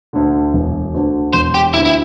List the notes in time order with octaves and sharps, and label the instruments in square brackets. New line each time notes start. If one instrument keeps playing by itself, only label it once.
[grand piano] D2 D3
E1
D2 D3
[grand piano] E1 [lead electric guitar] C5
[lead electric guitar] G4
[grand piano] D2 D3 [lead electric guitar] E4
[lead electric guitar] E4